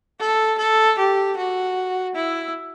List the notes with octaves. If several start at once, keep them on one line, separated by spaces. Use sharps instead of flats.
A4
A4
G4
F#4
E4